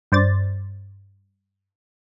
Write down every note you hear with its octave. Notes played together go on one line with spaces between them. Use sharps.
G2 C5 D5 A6